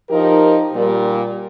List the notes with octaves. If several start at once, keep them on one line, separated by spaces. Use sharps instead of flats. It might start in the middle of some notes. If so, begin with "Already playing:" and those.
F3 D#4 G4 A#4
A#2 G3 A#3